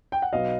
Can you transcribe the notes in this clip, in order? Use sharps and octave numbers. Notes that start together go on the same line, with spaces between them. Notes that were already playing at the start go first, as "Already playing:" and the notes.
G5
F#5
B1 B2 F#3 B3 D#5 F5